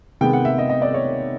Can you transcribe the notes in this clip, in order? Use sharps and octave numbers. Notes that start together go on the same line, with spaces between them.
C3 D#3 G#3 B3 G5
F#5
E5
D#5
D#5
D5
C#5